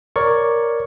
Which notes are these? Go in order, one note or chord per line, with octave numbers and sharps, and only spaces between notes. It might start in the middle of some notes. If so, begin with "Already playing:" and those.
A#4 C#5 D5 C#6